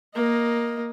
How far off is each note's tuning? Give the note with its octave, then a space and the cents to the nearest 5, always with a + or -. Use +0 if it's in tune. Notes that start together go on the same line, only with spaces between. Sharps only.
A#3 +10 D#5 +0